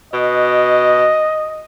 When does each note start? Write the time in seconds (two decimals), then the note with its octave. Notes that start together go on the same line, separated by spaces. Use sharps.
0.13 B2 D#5